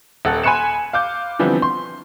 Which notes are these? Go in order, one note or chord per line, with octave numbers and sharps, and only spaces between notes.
D#1 A4 F#5
G#5 B5 C6 F#6 C#7 E7
F5 D6 G6
D3 E3 F3 G3 B3 C4
C6